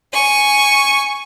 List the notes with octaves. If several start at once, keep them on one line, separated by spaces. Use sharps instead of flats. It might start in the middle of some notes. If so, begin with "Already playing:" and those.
G#5 C#6